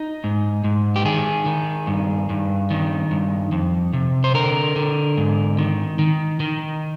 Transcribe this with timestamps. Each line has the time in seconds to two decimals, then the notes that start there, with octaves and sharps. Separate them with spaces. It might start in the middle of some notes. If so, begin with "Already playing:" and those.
Already playing: D#4
0.24 G#2
0.64 G#2
0.96 G4
1.05 D#3 G#4
1.46 D#3
1.87 G2
2.30 G2
2.70 D#3
3.11 G2
3.52 F2
3.93 C3
4.24 C5
4.34 D3 A#4
4.76 D3
5.17 G#2
5.59 D#3
5.99 D#3
6.40 D#3